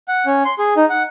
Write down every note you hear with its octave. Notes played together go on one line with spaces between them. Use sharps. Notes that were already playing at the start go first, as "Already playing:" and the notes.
F#5
C#4
C6
G#4
D#4
F#5